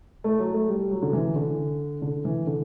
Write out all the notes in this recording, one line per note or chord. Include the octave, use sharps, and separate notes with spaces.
A3
F#3
A3
G3
F#3
D3
E3
D3
D3
E3
D3